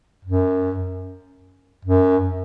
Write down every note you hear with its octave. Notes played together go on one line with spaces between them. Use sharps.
F#2
F#2